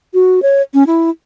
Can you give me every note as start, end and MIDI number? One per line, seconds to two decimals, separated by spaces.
0.14 0.42 66
0.42 0.62 73
0.74 0.83 61
0.87 1.10 64